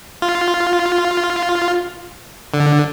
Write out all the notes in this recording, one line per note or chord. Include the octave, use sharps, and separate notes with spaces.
F4
D3